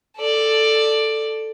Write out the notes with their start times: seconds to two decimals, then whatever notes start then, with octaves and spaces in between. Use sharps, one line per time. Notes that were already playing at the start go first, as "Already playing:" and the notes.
0.17 A4 D5